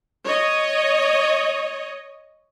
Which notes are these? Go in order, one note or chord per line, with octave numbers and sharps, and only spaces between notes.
C#5 D#5